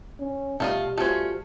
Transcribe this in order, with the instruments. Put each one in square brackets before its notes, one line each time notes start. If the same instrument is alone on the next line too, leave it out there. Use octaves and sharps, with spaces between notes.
[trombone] C#4
[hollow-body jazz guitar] B2 [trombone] G3 [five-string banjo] A3 F4 D#5
[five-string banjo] A3 C#4 [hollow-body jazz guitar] F4 F#4 C5